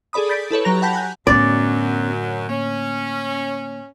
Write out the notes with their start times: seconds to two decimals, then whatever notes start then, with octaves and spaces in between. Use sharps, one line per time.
0.13 G#4 A4 D5 B5 D#6
0.29 G6 A6 B6 D7
0.51 E4 A4 B4 C#5
0.65 F#3 G4 A#5 A#6 F7
0.82 F#5 G5 A5 B5 G6 B6
0.94 G#5 F#6 G6
1.27 F#2 A2 D3 F#3 B3 C#4 D5
2.49 A#3 C#4